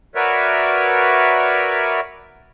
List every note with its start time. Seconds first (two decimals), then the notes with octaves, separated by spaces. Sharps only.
0.15 F#4 A#4 B4 C#5 D5 E5